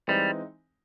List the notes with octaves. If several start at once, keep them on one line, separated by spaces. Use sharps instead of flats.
E3 G3 G#3 C4 D#4